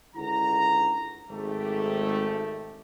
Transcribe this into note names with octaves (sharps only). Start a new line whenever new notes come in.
C#2 D3 E4 F#4 A#5
G#1 A3 G4